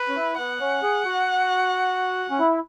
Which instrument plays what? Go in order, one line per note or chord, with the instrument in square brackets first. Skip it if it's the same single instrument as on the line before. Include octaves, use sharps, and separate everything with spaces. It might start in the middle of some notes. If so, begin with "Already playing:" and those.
Already playing: [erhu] B4
[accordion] C#4
E4
[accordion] B3 [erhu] F#5
[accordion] C#4
G#4
F#4
C#4
E4